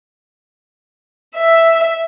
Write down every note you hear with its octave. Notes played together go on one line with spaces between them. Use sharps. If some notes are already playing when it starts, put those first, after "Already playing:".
E5